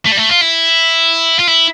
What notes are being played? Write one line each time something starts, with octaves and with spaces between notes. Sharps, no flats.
A3
G3
A3
F4
E4
F4
E4